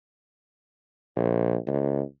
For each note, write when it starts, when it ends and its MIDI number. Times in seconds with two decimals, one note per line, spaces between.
1.16 1.56 34
1.67 2.02 37